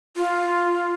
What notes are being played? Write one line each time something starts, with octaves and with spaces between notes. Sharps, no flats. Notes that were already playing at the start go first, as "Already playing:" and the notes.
F4